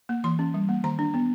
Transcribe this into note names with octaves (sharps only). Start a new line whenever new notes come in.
A#3
E3 C6
C#4
G3
A#3
D#3 A#5
D4
B3